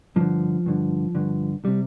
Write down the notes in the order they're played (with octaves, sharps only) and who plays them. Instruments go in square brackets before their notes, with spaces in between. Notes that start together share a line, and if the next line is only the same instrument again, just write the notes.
[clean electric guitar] G2 D3 F3
G2 D3
G2 D3
C3 G3